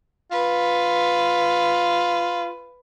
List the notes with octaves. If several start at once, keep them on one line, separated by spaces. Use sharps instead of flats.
F4 B4